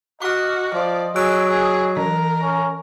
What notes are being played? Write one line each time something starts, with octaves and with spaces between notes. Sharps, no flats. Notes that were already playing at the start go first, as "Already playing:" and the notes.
F#4 D#5 D6 F6
F3 D5
F#3 G#4 E6 F#6 D7
G#4
E3 A#4
C#4